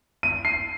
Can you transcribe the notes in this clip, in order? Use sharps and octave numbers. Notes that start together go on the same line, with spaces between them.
D#7
C7